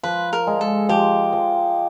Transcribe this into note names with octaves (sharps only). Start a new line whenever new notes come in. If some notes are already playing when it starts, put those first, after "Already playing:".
F3 B4
A#4
G#3
A4
F3 G4
F3